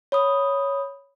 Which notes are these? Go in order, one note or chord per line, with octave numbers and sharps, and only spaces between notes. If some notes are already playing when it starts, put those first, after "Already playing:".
C#5 B5 D#6